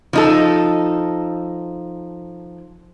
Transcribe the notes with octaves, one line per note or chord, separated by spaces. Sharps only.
F3 D#4 A4